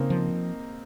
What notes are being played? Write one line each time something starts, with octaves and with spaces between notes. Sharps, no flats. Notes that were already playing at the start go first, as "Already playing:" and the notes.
Already playing: C#3 A#3 C4 D#4
F3